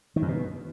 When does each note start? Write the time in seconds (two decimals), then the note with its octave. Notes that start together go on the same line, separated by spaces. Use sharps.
0.16 D#3
0.22 F#2
0.28 B2